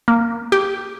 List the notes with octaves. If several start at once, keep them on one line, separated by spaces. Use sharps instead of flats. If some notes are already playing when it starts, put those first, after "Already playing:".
A#3
G4